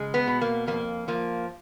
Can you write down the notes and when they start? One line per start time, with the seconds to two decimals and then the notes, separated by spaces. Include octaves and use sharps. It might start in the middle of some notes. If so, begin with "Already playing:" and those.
Already playing: C#3 G#3
0.14 B3
0.27 B2
0.41 A#3
0.67 F2 A#3
1.08 F3 A#3